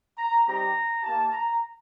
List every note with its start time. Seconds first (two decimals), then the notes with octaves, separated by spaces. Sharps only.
0.18 A#5
0.46 G3 C4 D#4 G4 A#5
1.03 A#3 D#4 G4 A5
1.32 A#5